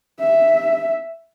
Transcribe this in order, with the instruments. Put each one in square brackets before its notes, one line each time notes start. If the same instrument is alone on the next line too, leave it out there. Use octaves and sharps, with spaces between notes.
[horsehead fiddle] E5